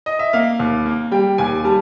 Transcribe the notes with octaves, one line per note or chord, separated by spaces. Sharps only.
D#5
E5
A#3 F5
D#2
A#3
G3 G5
D#2 G#5
G3 A5